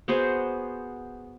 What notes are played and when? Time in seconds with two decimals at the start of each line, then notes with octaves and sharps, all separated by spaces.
0.08 B3 F#4 G#4 C5